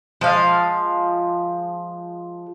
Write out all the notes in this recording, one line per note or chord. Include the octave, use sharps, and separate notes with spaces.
F3 G#3 F5